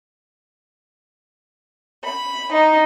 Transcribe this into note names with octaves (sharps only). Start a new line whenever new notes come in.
B5
D#4